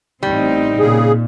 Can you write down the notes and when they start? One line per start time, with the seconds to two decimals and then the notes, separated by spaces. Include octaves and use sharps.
0.23 A1 G3 C4 D#4
0.79 A#2 C#3 G#4